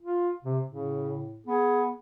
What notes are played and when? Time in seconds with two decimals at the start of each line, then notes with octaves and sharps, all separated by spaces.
0.01 F4
0.44 C3
0.67 A2 C#3
1.47 B3 G#4